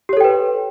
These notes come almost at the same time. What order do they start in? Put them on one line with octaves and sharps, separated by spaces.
G4 C#5 A4 G5 B4